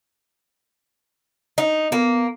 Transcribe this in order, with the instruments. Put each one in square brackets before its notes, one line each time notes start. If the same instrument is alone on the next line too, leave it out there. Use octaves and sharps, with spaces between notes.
[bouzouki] D#4
[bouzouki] A#3 [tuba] B3